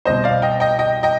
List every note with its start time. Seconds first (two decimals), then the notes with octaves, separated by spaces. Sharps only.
0.05 C2 B2 C5 D#5
0.24 D5 F5
0.42 D#5 G5
0.60 D#5 G5
0.79 D#5 G5
1.03 D#5 G5